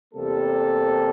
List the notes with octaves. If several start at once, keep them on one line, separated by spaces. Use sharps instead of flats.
E2 C3 G3 A#3 A4